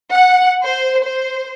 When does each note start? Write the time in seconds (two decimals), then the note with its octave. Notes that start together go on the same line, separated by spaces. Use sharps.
0.12 F#5
0.62 C5
1.01 C5